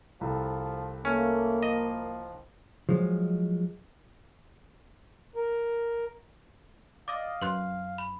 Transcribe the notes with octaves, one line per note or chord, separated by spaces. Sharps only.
C2 F3 A4
A3 A#3 C#4
F3 D#5
F3 F#3 G#3
A#4
D5 D#5 F5 D6
F#2 B4 C6 F#6
B5